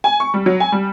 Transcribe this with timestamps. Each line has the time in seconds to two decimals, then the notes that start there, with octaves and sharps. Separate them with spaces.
0.04 G#5
0.20 C#6
0.34 G3
0.46 F#3
0.60 G#5
0.72 G3